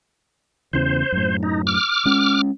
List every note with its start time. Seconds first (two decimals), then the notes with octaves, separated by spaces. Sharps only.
0.73 E2 C#3 E3 C5
1.12 F#2 A2
1.43 D#4
1.67 D6 F6
2.05 G#3 C#4